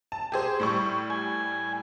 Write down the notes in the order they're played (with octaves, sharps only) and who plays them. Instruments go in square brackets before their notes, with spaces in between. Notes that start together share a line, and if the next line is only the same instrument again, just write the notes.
[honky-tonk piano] A5
G4 G#4 C5
A2 G3 C#6
[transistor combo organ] G#5